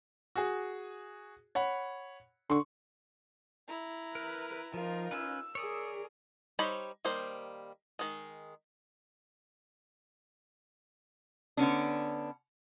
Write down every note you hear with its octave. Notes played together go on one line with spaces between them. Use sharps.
F#4 G#4
C#5 F#5 B5
D3 C6 C#6
E4 A#5
A#4 B4
F3 D#4 F4 A#4
C#4 B4 E6
G#4 A#4 C#5 D5 D#6
G3 D#4 C5 C#5 B5
D#3 G3 A#3 C5
D#3 G#3
D3 B3 C#4 D4